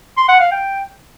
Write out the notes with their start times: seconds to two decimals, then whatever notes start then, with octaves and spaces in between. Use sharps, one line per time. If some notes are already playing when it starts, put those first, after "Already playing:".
0.17 C6
0.29 F#5
0.40 F5
0.51 G5